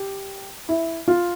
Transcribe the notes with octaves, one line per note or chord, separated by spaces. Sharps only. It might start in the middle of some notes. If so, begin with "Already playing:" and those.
Already playing: G4
E4
F4